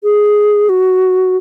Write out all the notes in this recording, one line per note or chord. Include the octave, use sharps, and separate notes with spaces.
G#4
F#4